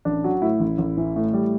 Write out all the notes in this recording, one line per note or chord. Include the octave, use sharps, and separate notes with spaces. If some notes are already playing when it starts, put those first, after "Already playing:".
A1 D4
F#3
A2 E4
A1
A1
E3
A2
G3